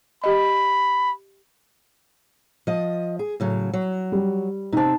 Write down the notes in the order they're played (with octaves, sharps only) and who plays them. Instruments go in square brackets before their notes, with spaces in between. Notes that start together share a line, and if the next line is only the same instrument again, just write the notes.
[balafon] G4 D#5 [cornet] B5
[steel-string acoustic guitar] F3 D#5
G#4
A2 C#3 F#3
F#3
[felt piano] G3
[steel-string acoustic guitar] C3 C4 [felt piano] D#4 A5